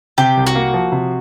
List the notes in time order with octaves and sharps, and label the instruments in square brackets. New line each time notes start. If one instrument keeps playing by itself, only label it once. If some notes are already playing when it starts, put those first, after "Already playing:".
[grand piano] C3 [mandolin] G4
[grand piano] C2
[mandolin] F#4
[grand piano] A#3
F3
C3